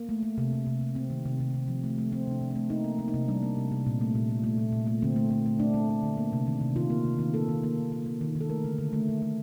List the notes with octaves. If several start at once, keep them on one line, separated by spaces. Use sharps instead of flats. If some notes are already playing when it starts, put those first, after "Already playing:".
Already playing: A#3
A3
A3
C3
C3
C3
C3
C3 C4
D#3
C3
C3
C3
F3
A3
A3
A3 C4
C3 D4
C3
A3 C4
A#3 D#4
A#3
A#3
D#4
C3
G3 D4
A#3
C3
C3
A#2
A3
A#2
A3
A3
A#2
A#2
A3
D3 C4
A3
A3
A3
A3 D4
A3
A3
D3
A#3
C3
D#3
C3
D#3 F4
A#3
C3
D#3
A#3 A4
D#3
A#3
D#3
A#3
A#3
D#3
D#3
A4
A3 A#4
D3
D3
A3
D3
A3